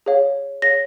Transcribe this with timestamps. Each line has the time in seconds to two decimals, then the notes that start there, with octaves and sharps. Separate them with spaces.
0.06 G#4 C#5 F5
0.62 G#4 C#5 F5 A#6